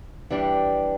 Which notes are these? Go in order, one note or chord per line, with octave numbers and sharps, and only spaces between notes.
E3 G3 D4 G4